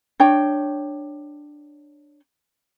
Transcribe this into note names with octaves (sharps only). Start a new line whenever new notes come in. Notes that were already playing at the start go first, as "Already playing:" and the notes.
D4 C#5 G5